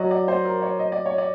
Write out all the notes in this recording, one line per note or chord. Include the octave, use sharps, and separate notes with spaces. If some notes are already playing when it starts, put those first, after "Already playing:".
Already playing: F#3 D5 D#5
D5
C5
A#4
C#5
D#5
D5
C#5
D5